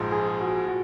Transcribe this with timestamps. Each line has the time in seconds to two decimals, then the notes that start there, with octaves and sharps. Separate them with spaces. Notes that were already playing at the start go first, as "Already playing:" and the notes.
Already playing: A#1 G#2 F3 G#4
0.12 G#4
0.41 F#4
0.68 F#4